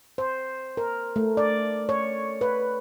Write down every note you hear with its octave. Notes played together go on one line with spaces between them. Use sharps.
C5
A#4
A3
D5
C#5
B4